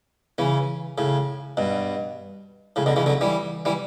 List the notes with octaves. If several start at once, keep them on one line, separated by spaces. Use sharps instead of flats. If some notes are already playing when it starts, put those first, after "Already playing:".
C#3 E3
A2 C#3
G2 B2
A2 C#3
B2 D3
C#3 E3
D3 F#3
E3 G3
E3 G3